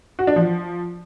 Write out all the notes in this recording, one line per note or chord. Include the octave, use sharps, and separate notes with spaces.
F#4
D4
F3